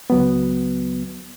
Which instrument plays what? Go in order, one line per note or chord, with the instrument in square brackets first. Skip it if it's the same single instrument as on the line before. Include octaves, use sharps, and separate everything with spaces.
[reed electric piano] C#2 F#3 B3